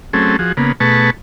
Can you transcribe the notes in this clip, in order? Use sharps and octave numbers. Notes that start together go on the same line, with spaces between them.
F#3 A3 C4 C#4 G#4 A4
F3 F#4 G#4
C#3 A#3 B3
B2 A3 G#4 B4 A5 C#6